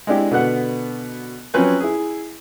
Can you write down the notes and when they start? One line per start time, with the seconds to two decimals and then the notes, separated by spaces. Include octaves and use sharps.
0.07 G#3 C4 D4 E4 G4
0.31 B2 D3 B3 F#5
1.54 F3 F#3 C4 C#4 B4 G#5
1.80 E4 G#4